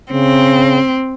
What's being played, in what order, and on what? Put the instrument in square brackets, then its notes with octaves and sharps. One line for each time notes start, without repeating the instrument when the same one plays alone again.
[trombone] C#3 [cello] C4